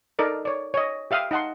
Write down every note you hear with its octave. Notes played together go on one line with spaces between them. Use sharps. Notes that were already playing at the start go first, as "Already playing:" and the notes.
D#4 A4 A#4 D5 D#5
C#5 D5
C#5 D#5
G4 E5 F5 G5 D#6
D#4 D#5 F#5 A5 C6